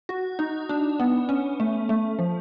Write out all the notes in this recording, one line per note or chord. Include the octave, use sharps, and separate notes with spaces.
F#4
D#4
D4
B3
C#4
A3
A3
F3